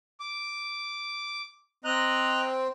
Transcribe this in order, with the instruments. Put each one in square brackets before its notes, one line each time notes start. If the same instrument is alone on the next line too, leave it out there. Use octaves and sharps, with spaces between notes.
[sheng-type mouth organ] D6
[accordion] C4 [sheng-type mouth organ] D#5 A#5 F#6